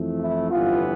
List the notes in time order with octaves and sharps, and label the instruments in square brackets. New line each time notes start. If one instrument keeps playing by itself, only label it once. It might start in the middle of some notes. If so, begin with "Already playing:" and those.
Already playing: [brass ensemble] F2 E3 A3
E4
G1 F2 E3 B3 F4